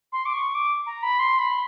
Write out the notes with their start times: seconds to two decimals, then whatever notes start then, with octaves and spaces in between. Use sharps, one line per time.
0.12 C6
0.25 D6
0.33 C#6
0.54 D6
0.86 A#5
1.03 B5
1.19 C6
1.39 B5